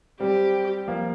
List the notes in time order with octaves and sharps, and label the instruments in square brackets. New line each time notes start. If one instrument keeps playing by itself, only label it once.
[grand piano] G3 C4 [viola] G4
[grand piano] F3 A#3